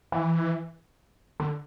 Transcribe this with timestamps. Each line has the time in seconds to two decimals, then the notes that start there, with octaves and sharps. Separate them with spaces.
0.12 E3
1.40 D3